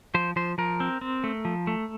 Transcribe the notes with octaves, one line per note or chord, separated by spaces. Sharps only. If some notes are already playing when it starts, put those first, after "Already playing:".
F3 C5
F3 C5
F3 A#4
C4
C4
A3
F3
A3